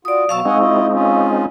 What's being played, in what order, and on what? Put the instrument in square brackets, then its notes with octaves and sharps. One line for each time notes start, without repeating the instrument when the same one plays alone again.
[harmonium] F4 F#4 [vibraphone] D5 D#6
[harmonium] B2 F#3 [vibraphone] F5 C#6 E6 [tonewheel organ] A5
[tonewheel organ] G#3 C4 D#4 [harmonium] D#5 F#5 G#5
[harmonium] E4 F4 D#5
C#4 F4